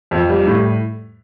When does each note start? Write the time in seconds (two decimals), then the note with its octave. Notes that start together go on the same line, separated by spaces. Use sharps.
0.11 F2
0.29 G3
0.46 A2